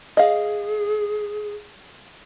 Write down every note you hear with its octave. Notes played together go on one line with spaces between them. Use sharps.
G#4 D#5 F5